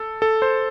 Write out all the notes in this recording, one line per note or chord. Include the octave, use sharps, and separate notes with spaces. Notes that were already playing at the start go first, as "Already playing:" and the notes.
Already playing: A4
A4
C5